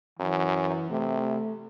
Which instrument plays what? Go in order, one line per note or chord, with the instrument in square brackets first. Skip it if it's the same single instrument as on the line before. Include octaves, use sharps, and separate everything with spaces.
[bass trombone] F#2 [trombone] E3
[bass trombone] C3 [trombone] A3